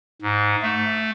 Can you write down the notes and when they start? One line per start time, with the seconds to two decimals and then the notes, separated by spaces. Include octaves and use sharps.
0.22 G#2
0.62 A3